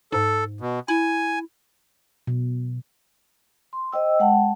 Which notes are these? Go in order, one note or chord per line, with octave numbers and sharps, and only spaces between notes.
G#2 A4
B2
E4 G#5
B2
C6
C5 D#5 G5 E6
G#3 F#5 G5 A5